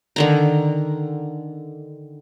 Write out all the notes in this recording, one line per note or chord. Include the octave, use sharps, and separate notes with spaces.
D3 D#3 A#5